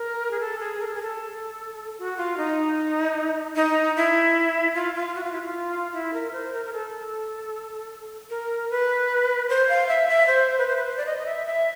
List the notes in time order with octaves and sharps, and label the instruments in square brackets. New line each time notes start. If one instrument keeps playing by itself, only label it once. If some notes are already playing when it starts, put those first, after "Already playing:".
Already playing: [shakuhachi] A#4
G#4
A4
G#4
A#4
A4
G#4
A4
F#4
F4
D#4
D#4
E4
F4
F4
F#4
F4
E4
F4
E4
A#4
C5
A#4
A#4
A4
A#4
B4
C5
F5
E5
E5
C5
B4
C5
B4
C5
D5
D#5
D#5
E5
E5